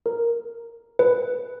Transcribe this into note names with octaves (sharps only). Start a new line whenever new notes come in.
A#4
B4